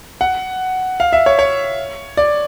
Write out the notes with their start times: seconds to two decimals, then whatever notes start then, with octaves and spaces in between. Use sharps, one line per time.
0.21 F#5
1.00 F5
1.13 E5
1.26 C#5
1.39 C#5
2.17 D5